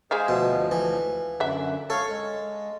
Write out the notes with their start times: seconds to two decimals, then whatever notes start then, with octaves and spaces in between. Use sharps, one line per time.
0.11 G#3 G#4 C5 E5 F5
0.28 D2 B2 F3
0.71 E3
1.40 F#2 D3 E5 F#5
1.90 A4 C#5 F5 C#6
2.09 G#3